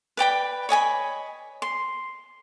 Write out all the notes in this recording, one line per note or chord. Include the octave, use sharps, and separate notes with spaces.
B4 D5 G5 B5
C#5 D#5 G#5 B5
C6